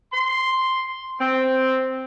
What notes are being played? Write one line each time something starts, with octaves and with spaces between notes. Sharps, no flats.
C6
C4